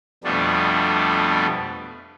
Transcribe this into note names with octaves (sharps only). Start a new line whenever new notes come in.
F2 B2 G3 A3 B3 D4